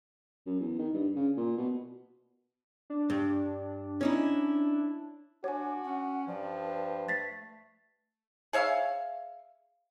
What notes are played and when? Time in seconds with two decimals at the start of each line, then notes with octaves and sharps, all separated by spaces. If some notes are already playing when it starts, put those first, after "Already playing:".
0.46 F#2
0.60 E2
0.79 D#3
0.94 G2
1.16 C#3
1.37 A#2
1.58 B2
2.90 D4
3.10 G2
4.01 C#4 D#4 E4
5.44 D4 F#4 C#5 G#5 D6
5.84 C#4 F#5
6.28 G2 F3 D5
6.65 B4
7.08 A3 A6 B6 C7
8.53 G#4 C#5 E5 F5